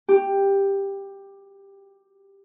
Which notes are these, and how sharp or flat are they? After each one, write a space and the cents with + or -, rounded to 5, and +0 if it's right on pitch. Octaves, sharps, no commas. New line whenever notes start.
G4 +10